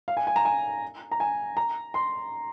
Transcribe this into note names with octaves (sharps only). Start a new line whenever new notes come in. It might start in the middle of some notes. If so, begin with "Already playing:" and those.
F5
G#5
G#5
A#5
G#5
A#5
G#5
A#5
C6